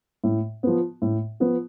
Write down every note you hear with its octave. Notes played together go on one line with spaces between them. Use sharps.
A2
F3 B3
A2
F3 B3